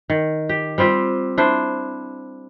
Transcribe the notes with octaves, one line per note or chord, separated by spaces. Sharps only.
D#3
G4
G3 C4 F4 G4
D4 E4 C5